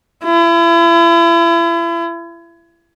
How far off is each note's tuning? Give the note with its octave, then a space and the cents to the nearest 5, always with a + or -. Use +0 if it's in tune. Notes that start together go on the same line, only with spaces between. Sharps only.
E4 +35